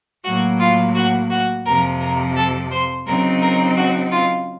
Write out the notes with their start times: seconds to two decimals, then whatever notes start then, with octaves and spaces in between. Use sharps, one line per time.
0.24 A2 F#3 A#3 F#4 F#5
0.60 F4 F5
0.95 F#4 F#5
1.30 F#4 F#5
1.65 F2 C3 F3 A#4 A#5
2.00 A#4 A#5
2.35 A4 A5
2.71 C5 C6
3.06 C#3 F#3 C4 D#4 A#4 A#5
3.41 A#4 A#5
3.76 F#4 F#5
4.12 F4 F5